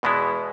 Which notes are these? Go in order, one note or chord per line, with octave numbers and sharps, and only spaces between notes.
E2 B2 G#3 B3 E4